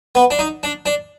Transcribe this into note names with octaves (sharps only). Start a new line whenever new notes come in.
B3
D4
D#4
D4
D4